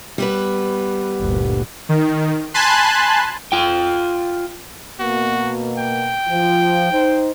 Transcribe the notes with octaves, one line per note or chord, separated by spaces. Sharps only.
G3 B3 B4
G1 D2 A#2
D#3
G#5 A5 B5 C6 F#6
F4 G5
B2 A#3 F#4
G5
F3
D#4 C5